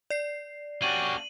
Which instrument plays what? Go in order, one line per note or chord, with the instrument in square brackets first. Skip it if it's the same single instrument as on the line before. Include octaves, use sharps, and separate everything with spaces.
[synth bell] D5 C7
[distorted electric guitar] A#3 D4 [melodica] C#4 F#4 G4 [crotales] D#7 F#7